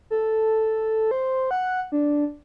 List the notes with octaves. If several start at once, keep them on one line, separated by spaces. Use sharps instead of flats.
A4
C5
F#5
D4